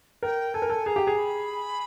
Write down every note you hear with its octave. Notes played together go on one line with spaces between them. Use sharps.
A#4 G5
A4 G#5
A#4
A4
G#4 A#5
G4
G#4
B5